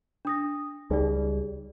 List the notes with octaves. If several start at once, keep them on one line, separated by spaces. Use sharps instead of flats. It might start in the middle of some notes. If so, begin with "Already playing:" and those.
D4 D#6 A#6
C#2 G3 D#4 G#4 D5